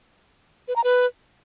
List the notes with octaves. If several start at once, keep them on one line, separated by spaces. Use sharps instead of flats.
B4
A#5
B4